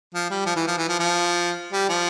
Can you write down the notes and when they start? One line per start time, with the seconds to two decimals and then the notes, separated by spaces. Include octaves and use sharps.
0.15 F3
0.30 G3
0.46 F3
0.56 E3
0.67 F3
0.78 E3
0.89 F3
0.99 F3
1.73 G3
1.89 F3